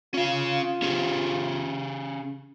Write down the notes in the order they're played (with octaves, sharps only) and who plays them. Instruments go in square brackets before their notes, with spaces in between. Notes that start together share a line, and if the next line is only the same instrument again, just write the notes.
[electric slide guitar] C#4 F5 [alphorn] F4
[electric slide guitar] C#4 G4 G#4